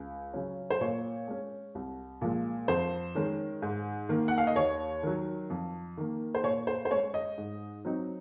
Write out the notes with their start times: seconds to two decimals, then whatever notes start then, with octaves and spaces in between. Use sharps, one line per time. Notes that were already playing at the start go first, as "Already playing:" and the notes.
Already playing: C#2
0.34 C#3 F#3 C#4
0.70 C5
0.81 A#2 C#5
1.28 G#3 C#4
1.75 C2
2.21 A#2 F3 G#3
2.68 F2 C5
3.15 D#3 G#3 C#4
3.62 G#2
4.09 D#3 A#3
4.28 F#5
4.38 F5
4.47 D#5
4.56 D#2 C#5
5.03 D#3 F#3
5.50 F2
5.97 D#3 A#3
6.35 C5
6.44 A#2 C#5
6.67 C5
6.85 C5
6.91 G#3 C#4 C#5
7.14 D#5
7.38 G#2
7.85 F#3 C4 D#4